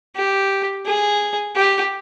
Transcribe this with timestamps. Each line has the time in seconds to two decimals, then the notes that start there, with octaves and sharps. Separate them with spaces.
0.16 G4
0.86 G#4
1.56 G4